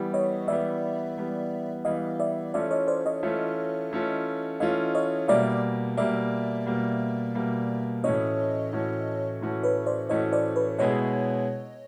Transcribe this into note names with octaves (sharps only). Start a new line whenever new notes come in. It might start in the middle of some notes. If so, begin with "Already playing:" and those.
Already playing: E3 G3 B3
C#5 D#5
E3 G3 B3 D5 E5
E3 G3 B3
E3 G3 B3 D#5 F5
D5 E5
E3 A3 C#4 F4 D5 E5
C#5 D#5
C5 D5
C#5 D#5
E3 A3 C#4 F4
E3 A3 C#4 F4
E3 A3 C#4 F4 D#5 F5
C#5 D#5
B2 G3 A#3 D5 E5
B2 G3 A#3 D5 E5
B2 G3 A#3
B2 G3 A#3
A2 E3 A3 C#4 F#4 C#5 D#5
A2 E3 A3 C#4 F#4
A2 E3 A3 C#4 F#4
B4 C#5
C5 D5
A2 E3 A3 C#4 F#4 C#5 D#5
C5 D5
B4 C#5
B2 G#3 B3 E4 G#4 C#5 D#5